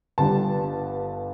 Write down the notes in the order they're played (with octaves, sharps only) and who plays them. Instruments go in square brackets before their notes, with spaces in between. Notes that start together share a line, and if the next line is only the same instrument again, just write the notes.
[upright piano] G1 G2 D3 G3 A5